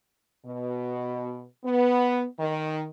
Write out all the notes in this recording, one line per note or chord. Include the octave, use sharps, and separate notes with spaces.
B2
B3
D#3